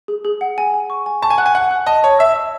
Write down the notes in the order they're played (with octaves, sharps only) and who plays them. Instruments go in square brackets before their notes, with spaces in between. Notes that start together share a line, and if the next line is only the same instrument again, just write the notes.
[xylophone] G#4
G#4
F#5
G#5
G#5
C#6
G#5
[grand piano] A5 [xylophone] C#6
[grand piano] G#5
[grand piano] F#5 [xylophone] F#6
[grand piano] G#5
[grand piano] F#5 [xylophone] F#6
[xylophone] F#6
[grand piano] D#5 [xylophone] A5
[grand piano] C#5 [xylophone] A5
[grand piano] E5 [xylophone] E6
[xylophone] E6